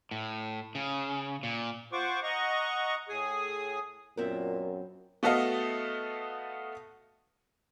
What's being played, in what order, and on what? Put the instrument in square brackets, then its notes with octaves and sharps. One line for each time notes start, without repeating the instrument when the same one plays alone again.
[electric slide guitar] A2
C#3
A#2
[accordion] F4 C5 F#5 C#6 D6
D#5 F#5 A#5 C#6
A2 G#4 G#5 D#6
[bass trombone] F#2 [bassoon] A#2 [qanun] B3 C4 E5 [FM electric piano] A#4
[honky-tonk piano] A3 B3 F#4 A4 D#5 F5